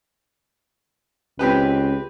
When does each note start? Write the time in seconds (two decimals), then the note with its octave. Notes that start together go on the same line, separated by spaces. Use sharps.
1.39 C#2 C4 G4 B4